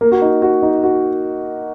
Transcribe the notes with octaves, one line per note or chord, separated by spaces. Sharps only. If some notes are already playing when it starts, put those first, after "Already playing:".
A#3
F#4
D#4
F#4
D#4
F#4